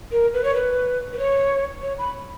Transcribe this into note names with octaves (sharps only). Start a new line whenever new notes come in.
A#4
B4
C#5
B4
B4
C#5
C#5
B5